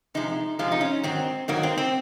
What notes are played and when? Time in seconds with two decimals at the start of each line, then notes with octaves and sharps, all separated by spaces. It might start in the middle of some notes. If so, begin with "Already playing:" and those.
0.14 C3 F3 G#3 D#4
0.59 C3 F3 G#3 F4
0.72 D#4
0.81 C#4
1.03 G#2 D#3 F#3 C4
1.48 G#2 D#3 F#3 A#3
1.63 C4
1.78 C4